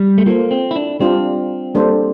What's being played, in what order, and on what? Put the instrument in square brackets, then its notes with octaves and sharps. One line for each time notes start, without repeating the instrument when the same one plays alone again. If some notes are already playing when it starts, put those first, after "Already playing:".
Already playing: [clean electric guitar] G3
A3
[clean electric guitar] A#3 [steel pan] F4 A4 C5
[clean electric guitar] C4
E4
D4
[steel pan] G3 D4 F4 C5 [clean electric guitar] C4
[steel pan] G3 A#3 D4 A4 C5